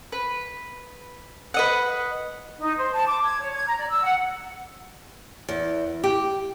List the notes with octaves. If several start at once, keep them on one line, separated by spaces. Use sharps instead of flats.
B4
B4 D#5 F#5
D#4
C5
A5
D6
G#6
C#5
G#6
A#5
D5
E6
F#5
E2
G4